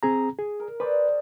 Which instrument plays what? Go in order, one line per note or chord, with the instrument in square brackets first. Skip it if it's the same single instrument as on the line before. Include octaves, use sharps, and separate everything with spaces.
[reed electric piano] C4 G#4 A#5
G#4
[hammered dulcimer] A#4
[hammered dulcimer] G#4 C5 D5 [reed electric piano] B4